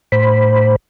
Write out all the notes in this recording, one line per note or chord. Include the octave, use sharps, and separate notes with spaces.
A2 C5 B5